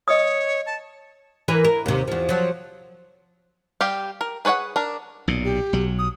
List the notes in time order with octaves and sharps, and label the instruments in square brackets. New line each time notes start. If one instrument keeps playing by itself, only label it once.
[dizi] C#5 [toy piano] D#5 D#6
[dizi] A5
[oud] E3 A#4 B4
A#4
D#2 C3
E2 F3
F3 F#3
[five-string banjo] G3 G4 F5
A#4
G#4 B4 C#5 E5 F#5
D4 A#4
[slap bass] B1 A#2
[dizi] G4
[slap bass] B1 F#3
[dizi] D#6